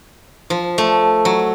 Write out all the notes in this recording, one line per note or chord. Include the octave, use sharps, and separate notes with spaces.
F3
A3
F#3